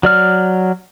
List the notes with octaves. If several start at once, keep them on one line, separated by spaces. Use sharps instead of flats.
F#3 D5 F6